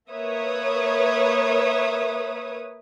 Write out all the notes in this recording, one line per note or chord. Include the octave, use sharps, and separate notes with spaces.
A#3 B4 C#5 E5 D#6